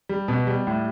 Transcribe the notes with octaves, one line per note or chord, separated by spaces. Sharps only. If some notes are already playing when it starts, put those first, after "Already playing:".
G3
B2
G3
A2